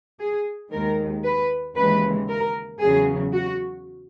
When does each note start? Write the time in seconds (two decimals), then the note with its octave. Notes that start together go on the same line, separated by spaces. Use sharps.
0.20 G#4
0.72 D#2 D#3 G#3 A#4
1.24 B4
1.76 D#2 C#3 E3 G#3 B4
2.29 A#4
2.81 E2 C#3 F#3 G#4
3.33 F#4